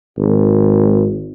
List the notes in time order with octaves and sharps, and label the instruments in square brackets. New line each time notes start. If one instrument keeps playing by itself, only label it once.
[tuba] G#1